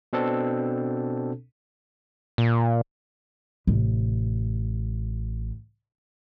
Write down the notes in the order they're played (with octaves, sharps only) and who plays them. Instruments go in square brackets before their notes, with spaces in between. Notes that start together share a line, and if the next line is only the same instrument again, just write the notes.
[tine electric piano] B2 C4 D4 A4
[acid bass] A#2
[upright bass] A1 C3